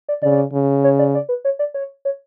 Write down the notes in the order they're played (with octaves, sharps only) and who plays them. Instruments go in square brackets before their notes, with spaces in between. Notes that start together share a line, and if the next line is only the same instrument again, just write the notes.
[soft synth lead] D5
[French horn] C#3 [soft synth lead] D5
[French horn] C#3
[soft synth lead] C#5
D5
D5
B4
C#5
D5
C#5
C#5